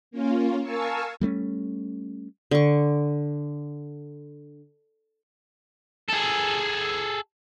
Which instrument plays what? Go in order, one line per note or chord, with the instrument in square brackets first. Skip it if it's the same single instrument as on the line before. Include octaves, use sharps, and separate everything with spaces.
[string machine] A#3 C#4 F4
A#4 F5 G#5 A5 C#6 E6
[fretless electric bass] G3 A3 C4 C#4
[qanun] D3 C#6
[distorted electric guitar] G#4 A4